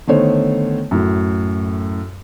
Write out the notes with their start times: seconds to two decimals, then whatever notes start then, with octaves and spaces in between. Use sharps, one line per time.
0.07 D3 D#3 A3 B3 C5 C#5
0.91 F#2 A2